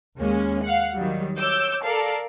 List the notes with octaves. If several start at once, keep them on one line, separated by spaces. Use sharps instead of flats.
D#2 G#3 A#3 C#4
F5 F#5
D#3 F#3 G3
C#5 D6 E6 G6
A4 A#4 D5 F5